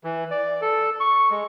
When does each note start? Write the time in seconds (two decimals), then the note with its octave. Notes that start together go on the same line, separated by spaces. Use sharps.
0.04 E3
0.31 D5
0.62 A4
1.00 C#6
1.31 G#3